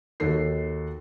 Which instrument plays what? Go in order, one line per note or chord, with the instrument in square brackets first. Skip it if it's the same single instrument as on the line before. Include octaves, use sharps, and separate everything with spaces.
[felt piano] D#2 D#4 F#4 A4 C7